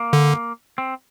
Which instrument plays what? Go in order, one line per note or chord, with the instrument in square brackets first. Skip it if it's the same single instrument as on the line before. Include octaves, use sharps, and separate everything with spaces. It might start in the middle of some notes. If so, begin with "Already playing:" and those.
Already playing: [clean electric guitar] A#3
[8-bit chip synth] D3
[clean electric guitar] C4